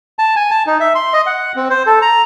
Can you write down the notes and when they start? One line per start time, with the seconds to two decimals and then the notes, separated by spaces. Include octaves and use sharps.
0.19 A5
0.36 G#5
0.51 A5
0.67 D#4
0.80 E5
0.95 C6
1.13 D#5
1.26 F#5
1.56 C4
1.70 C5
1.87 A4
2.02 A#5